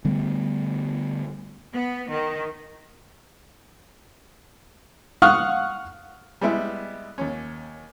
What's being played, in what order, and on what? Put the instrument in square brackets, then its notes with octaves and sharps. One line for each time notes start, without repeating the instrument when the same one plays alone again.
[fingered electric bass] D3 G3 A3 B3
[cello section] B3
D#3
[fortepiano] F5 F#5 C#6 D#6 F6 F#6
G3 G#3 B3 E4
D#2 C#4